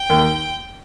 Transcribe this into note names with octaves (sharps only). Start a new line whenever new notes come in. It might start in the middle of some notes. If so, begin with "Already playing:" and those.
Already playing: G5
D#2 D#3